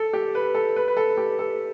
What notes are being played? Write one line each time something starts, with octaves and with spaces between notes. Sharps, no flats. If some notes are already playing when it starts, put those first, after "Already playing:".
Already playing: A4
G4
B4
A4
B4
B4
A4
G4
A4